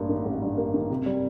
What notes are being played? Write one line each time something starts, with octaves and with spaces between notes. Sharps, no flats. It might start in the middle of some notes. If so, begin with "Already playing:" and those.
Already playing: A1 G2 A#3
D#3
A1
G2
A#3
D#3
C3
G3